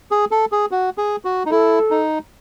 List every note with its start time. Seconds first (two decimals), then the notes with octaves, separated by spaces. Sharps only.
0.11 G#4
0.31 A4
0.52 G#4
0.71 F#4
0.98 G#4
1.25 F#4
1.46 D#4
1.51 E4 A4
1.91 D#4